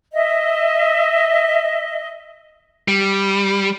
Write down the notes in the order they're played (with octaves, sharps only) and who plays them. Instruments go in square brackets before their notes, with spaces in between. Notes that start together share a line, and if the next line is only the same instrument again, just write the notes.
[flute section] D#5 E5
[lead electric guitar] G3